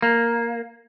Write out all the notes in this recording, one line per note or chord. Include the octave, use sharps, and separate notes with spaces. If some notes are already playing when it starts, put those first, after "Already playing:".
A#3